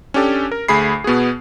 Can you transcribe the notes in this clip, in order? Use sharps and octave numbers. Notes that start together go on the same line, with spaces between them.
C#4 D4 G4 A4
A#4
D2 A3 G#4 B5 C7
B2 B3 F#4 G#4